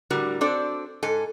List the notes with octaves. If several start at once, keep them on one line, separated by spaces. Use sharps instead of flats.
A2 D3 G3 F#4 A#4
C4 D4 F#4 A4 C5 D5
G#2 A4 G#5